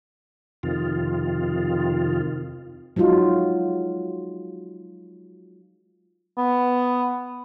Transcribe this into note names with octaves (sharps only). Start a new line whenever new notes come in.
F2 C3 D#3 F4
F#3 G#3 D#4 F4
B3